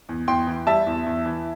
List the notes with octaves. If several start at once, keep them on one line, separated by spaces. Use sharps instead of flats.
E2
E2 G5 C6
E3
G3 E5 A5
E2
E2
E3